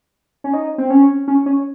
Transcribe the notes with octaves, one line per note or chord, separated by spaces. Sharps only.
C#4
D#4
C4
C#4
C#4
C#4